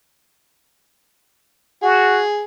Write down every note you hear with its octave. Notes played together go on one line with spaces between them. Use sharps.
F#4 G#4